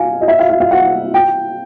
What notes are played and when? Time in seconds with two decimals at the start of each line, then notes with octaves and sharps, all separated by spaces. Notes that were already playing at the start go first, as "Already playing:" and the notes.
Already playing: F5 G#5
0.21 D#5
0.28 E5
0.39 F5
0.49 F5
0.60 F5
0.71 F#5
1.14 G5